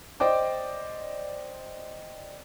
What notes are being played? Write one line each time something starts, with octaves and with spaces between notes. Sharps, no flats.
C5 D5 D#5 G5 D6